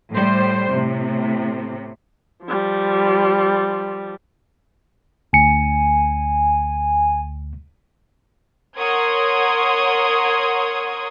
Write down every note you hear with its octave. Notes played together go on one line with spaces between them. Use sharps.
A2 G3 C5
A2 C3
F3 G3
D2 G#5 C#7
A#4 C#5 F#5 C6 D#6 G#6